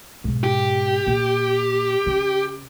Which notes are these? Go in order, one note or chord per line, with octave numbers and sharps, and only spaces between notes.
G#2 B2
G4
A#2
C#3